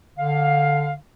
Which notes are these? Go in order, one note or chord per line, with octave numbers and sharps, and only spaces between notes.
D3 F5